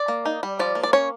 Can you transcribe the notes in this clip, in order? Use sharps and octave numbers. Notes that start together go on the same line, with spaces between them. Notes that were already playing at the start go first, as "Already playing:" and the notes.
Already playing: D5
A#3
D#4
G3
F3 D5
A#3
D5
C#4 C#5